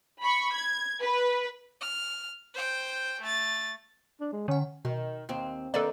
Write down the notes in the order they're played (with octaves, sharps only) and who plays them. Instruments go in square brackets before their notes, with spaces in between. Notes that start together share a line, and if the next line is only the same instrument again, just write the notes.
[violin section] B5 C#6
G#6
B4
[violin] F6
C5 G5
A3 A6
[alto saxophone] D4
G#3
[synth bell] D3 F#5 [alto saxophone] C#4
[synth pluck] B2 [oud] D#3
[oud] D#2 C4
[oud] D#3 A#3 D4 [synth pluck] A4 B4 D5